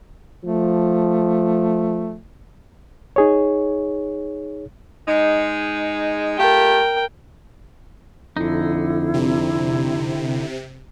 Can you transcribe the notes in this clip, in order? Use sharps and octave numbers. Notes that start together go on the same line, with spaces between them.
F3 A3
D#4 G#4 C#5
G#3 D#4
A3 F4 G4 A#4 G5
F2 D3 D#4 E4
C3